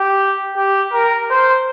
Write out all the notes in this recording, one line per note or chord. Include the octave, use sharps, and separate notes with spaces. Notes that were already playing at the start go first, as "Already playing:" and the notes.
Already playing: G4
G4
A#4
C5